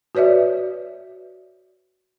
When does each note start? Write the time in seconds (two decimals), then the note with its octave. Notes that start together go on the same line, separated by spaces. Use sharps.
0.15 F#4 B4 C#5 D5 E5